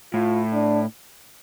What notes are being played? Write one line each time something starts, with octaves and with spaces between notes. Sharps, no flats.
A2 F4
D4